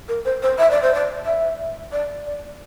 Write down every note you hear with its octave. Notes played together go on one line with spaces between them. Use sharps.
A#4
C5
C5
E5
D5
C5
D5
E5
D5
D5